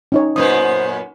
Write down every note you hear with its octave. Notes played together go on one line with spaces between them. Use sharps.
C#4 D#4 C#5
F#2 A#2 B3 B4 C5 D#6